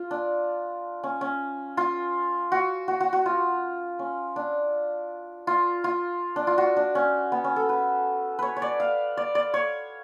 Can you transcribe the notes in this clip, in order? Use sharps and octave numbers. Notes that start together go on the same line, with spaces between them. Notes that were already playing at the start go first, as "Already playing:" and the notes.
Already playing: F4
D4
C#4
C#4
F4
F#4
F#4
F#4
F#4
F4
C#4
D4
F4
F4
D4
F4
F#4
D4
C#4
B3
C#4
A4
B4
B4 C#5
C#5
D5
F5
D5
D5
C#5